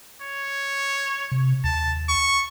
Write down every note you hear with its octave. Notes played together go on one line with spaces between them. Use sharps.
C#5
C3
D#2 A5
C#6